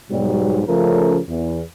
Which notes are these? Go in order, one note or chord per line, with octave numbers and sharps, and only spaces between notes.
B1 G#2 B2 F#3 G3
C#3 F3 A3 C#4 A4 A#4
E2